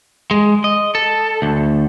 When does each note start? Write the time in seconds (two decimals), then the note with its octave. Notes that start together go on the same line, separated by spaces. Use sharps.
0.31 G#3
0.64 D#5
0.95 A4
1.42 D2